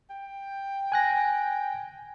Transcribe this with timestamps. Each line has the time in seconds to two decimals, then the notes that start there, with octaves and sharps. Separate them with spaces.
0.10 G5
0.92 G#5 F#6 A#6